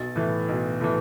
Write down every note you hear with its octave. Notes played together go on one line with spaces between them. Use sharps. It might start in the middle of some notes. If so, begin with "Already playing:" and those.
Already playing: B1 A6
A2 E3
B1
A2 E3